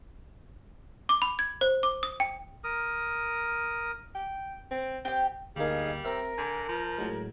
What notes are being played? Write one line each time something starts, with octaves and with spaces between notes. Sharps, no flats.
D6
B5
G#6
C5
D6
D#6
G5
A#4 D#6
G5
C4
C4 G4 G5
D2 G3 A#3 D#4 G#4 F5
C4 A#4 E5 F6
D3 G#5
F3
A2 F#3 G#3